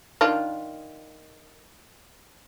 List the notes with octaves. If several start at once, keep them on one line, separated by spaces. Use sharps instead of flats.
D#3 D4 F4